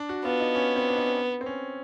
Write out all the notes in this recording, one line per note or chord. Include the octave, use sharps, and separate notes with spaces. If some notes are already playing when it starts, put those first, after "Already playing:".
Already playing: D4
F#4
B3 F4
D#4
C#4
C4
D4
D#4
C4
C#4